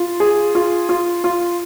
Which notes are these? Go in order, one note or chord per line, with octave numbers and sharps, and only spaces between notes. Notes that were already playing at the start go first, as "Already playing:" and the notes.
Already playing: F4
G#4
F4
F4
F4